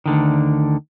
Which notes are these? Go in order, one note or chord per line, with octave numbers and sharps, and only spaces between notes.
D2 D3 D#3